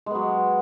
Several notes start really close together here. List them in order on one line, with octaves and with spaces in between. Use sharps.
G#3 B3 F#3